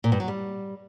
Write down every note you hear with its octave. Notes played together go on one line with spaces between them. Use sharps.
A#2
G2
F#3
G3